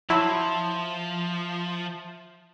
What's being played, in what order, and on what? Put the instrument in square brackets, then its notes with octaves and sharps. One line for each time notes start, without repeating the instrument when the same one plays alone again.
[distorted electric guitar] F3 [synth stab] F#3 E4 [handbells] E5 A5 C6